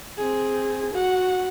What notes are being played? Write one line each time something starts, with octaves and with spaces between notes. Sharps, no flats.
C4 G#4
F#4 F#5